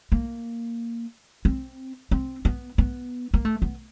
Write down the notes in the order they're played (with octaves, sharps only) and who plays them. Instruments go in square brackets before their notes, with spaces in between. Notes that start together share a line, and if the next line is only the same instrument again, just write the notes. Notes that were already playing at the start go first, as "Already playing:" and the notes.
[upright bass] A#3
C4
C4
B3
B3
A#3
A3
B3